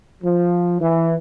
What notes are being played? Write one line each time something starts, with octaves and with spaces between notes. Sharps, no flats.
F3
E3